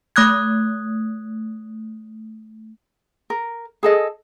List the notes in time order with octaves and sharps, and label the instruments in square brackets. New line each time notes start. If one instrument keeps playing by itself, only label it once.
[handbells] A3 D#6 F#6 G#6
[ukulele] A#4
G#4 A4 D#5